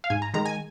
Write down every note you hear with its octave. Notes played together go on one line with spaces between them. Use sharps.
F5
G#2 G#5
A#5
D#3 G#3 A#5
G#5